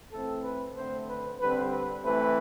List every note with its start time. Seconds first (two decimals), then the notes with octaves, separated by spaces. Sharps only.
0.12 E3 A3 C4 A4
0.44 B4
0.76 D3 A3 C4 C5
1.08 B4
1.39 D3 G3 C4 B4
1.71 B4
2.03 E3 A3 C4 B4